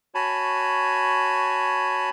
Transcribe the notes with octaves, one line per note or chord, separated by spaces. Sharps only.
F#4 C#5 G#5 A5 B5